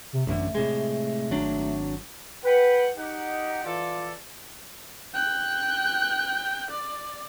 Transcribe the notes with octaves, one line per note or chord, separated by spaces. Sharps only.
C3
A1 F#2 D3 A3
A2 C3 G#3
G#1 F#3 D4
B4 F#5 G5
D#4 G4 F#5
E3 F4 A4 D5
G5 F#6
D5